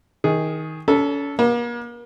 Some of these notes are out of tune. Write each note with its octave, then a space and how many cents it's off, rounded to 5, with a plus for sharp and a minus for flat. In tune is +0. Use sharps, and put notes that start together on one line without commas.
D#3 +25 G#4 +0
C#4 +35 A4 +0 A#5 +40
A#3 +40 A#5 +40